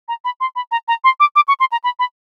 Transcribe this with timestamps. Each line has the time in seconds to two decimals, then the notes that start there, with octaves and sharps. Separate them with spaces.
0.08 A#5
0.25 B5
0.40 C6
0.56 B5
0.72 A#5
0.88 A#5
1.04 C6
1.20 D6
1.36 D6
1.48 C#6
1.60 C6
1.72 A#5
1.84 B5
1.99 B5